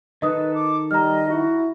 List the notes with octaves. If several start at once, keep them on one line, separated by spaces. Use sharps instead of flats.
D#3 A4 B4 D#5 D#6
D6
G3 D#5 A#5 F6
E4 F#4